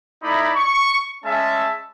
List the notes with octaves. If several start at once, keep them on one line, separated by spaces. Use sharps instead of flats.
A3 D#4 E4 D5 B5
C#6
G#3 C#4 E5 A5